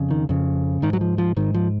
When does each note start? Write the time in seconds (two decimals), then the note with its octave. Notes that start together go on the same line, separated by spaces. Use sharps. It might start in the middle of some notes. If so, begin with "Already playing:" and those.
Already playing: F2 C#3
0.11 D#3
0.29 F2 C#3
0.82 G#2 D#3
0.93 F#3
1.01 F3
1.18 F3
1.37 G#2 D#3
1.54 F3